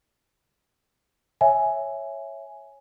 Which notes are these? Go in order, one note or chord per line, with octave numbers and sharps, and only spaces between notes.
C#5 E5 G#5